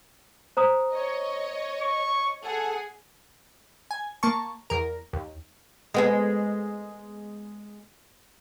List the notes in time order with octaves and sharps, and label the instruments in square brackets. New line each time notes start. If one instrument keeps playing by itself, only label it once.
[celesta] C5 A#5 D#6
[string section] C#5 D#5
[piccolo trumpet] C#6
[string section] G#4 F#5 G#5 [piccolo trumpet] A4
[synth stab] G#5
A#3 A5 C#6
E2 A#4
D#2
[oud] G#3 B3 G#4